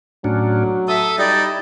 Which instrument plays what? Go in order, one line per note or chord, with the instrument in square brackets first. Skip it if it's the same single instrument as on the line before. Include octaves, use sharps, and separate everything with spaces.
[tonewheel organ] A2 C#4 D4 [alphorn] F#3
[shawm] A4 [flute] E5 [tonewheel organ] D#6
[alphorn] G3 [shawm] D#4 [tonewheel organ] E4 [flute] D5